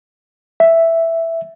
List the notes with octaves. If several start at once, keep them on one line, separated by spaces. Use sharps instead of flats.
E5